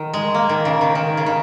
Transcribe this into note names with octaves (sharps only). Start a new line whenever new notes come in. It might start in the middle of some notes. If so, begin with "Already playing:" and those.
Already playing: D#3
G#3
A#3
D#3
C#3
D#3
D#3
C#3
D#3